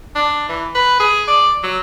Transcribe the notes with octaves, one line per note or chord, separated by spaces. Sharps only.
D4
E3
B4
G#4
D5
F#3